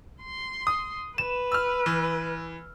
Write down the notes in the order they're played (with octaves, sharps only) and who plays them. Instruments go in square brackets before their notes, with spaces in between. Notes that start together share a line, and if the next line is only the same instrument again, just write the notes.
[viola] C6
[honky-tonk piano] D#6
[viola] B4 [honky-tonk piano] E7
[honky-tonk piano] E6 F6
E3